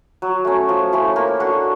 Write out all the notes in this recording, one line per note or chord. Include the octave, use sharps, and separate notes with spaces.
F#3
A3 C#4
F3
A3 C#4 E4
A#3
D4 F#4 A4